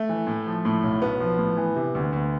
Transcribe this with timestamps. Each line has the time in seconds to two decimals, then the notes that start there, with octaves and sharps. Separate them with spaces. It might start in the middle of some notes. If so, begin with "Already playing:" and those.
Already playing: A3
0.09 E3
0.27 A2
0.47 F3
0.65 A2
0.83 B1
1.02 B1 B3
1.20 F3
1.39 A2
1.57 E3
1.76 C3
1.95 D2
2.12 D2